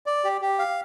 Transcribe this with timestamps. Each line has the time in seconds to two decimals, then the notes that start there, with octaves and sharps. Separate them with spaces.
0.06 D5
0.24 G4
0.41 G4
0.59 F5